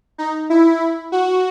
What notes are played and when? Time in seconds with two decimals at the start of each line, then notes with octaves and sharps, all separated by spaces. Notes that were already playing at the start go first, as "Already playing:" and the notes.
0.18 D#4
0.50 E4
1.12 F#4